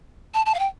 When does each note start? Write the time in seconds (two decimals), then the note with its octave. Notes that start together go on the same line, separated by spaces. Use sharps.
0.34 A5
0.46 A5
0.55 F5
0.59 G5